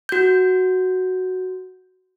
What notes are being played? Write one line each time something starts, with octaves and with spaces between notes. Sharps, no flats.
F#4 G6